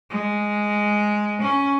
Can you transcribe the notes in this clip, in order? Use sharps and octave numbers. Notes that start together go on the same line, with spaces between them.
G#3
C#4